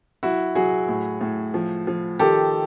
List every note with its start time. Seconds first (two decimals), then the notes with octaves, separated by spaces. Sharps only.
0.23 F#3 E4 F#4
0.55 F#3 F#4 G#4
0.88 A2
1.21 A2
1.54 F3
1.87 F3
2.19 D#3 G4 A4